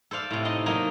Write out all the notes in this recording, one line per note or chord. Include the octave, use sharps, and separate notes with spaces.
A4 C5 D5 F5
A2 C3
D#4 D#5 A5 C6
F#3 A#3 D#4 D#5